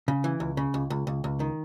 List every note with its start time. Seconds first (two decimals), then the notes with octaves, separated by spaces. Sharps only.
0.08 C#3
0.24 E3
0.40 C#2
0.57 C#3
0.74 C#2
0.90 C#2
1.07 C#2
1.24 C#2
1.40 D#3